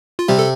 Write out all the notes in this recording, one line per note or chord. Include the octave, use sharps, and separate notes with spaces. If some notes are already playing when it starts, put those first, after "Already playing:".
F4
C3 G3 G4
A4